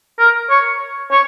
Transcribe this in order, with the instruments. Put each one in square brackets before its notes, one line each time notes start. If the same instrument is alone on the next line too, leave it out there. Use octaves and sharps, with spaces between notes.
[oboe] A#4
C#5
C#5